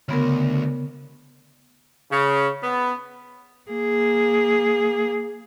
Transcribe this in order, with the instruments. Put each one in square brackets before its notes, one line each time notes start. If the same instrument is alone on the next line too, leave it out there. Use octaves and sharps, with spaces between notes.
[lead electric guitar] D2 [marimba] C#3 B3 A#4
[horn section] C#3
B3
[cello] A#3 G#4